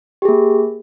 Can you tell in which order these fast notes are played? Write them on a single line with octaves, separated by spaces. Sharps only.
G4 G#4 A#3